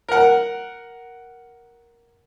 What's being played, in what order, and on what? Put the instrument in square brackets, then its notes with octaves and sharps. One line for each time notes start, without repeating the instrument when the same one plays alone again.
[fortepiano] A#4 F#5